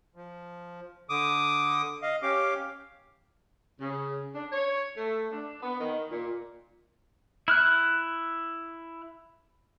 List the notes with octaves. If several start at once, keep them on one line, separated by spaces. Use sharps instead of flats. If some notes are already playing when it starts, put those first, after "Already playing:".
F3
D3 D6 D#6
D#5 F5
C#4 G4 F5 D6
C#3
D4
C#5
A3
D4
B3
D#3
A#2
E4 F6 F#6